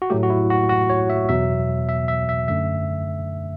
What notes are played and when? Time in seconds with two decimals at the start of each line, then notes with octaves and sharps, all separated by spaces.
0.02 F#4
0.10 A2 F#3 A3 G4
0.23 F#4
0.30 E4
0.50 F#4
0.70 F#4
0.90 C#5
1.10 E5
1.29 E2 B2 F#3 E5
1.89 E5
2.08 E5
2.29 E5
2.48 F#2 D3 A3 E5